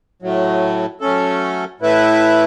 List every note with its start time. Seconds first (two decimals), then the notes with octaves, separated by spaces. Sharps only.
0.22 A2 F#3 A3
1.01 F#3 A3 C#4 A4
1.81 A2 A3 E4 B4 E5